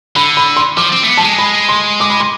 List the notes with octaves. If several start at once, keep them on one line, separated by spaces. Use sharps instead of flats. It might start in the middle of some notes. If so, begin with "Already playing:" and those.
D3 B5
B5
C6
F3 D6
C4
A3
B3
F3 A5
G#3
B5
C6
D6
B5
C6